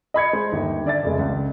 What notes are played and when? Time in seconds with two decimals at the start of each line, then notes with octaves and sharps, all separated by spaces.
0.14 D#5 B5 G#6 C#7
0.33 G#3 C5
0.52 G1 D#2
0.85 D3 D5 E5 A6
1.04 F1 C#3 G#3
1.19 C#2